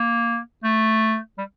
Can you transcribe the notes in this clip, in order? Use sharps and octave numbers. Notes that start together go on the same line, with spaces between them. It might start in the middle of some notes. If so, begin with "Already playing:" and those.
Already playing: A#3
A3
G3